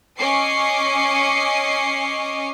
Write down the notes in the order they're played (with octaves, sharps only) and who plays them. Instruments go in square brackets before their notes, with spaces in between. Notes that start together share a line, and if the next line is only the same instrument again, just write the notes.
[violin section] C#4 D#5 D6 C7 C#7